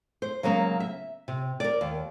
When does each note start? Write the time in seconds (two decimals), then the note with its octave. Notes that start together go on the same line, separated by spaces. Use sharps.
0.22 C5
0.43 C#3 F#3 G#3 A#3 C#4
0.80 E5
1.28 C3
1.60 A#4 D5
1.81 D#2